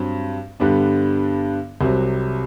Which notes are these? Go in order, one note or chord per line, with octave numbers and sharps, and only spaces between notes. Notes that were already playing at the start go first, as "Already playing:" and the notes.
Already playing: G2 F#3 C4
G2 D3 G3 B3 D4
C2 C3 F#3